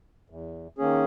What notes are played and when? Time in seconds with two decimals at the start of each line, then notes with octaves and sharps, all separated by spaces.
0.30 E2
0.78 D#3 A#3 C#4 G#4